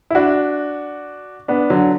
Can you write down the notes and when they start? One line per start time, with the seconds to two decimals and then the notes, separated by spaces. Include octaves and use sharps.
0.10 E4
0.15 D4 F#4
1.48 B3 D4
1.70 D3 F#3